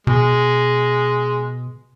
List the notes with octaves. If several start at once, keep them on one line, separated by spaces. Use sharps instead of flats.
B2 G#3